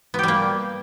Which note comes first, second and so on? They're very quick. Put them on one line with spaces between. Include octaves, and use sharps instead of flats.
B3 G4 G3 A#3